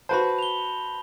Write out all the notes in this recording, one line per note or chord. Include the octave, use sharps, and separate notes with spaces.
F#4 B4 C5 A5 B5
F7 G7